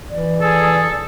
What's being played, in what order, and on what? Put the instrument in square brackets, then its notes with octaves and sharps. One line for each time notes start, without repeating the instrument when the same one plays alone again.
[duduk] E3 [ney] D5
[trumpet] G#4 [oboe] A4